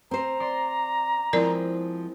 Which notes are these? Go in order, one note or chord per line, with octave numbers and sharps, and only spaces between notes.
C4 C5 A#5
D5 C6
F3 G#3 C4 E4 A#4 D5